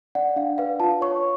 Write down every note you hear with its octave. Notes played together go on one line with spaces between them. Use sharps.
D5 F#5
D4 F5
B4 F5
F4 A5
C#5 C#6